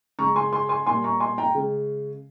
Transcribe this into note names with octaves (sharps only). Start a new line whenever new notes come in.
C#3 G#3 A#5 C#6
G#5 C6
G#5 C6
G#5 C6
A#2 G3 A#3 G#5 C6
A#5 C#6
G#5 C6
G5 A#5
C#3 G#3